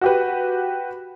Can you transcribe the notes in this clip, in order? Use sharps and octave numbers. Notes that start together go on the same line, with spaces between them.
F#4 G4 B4